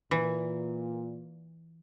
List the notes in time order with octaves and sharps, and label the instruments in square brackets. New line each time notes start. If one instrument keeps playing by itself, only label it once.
[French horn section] A#2 [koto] E3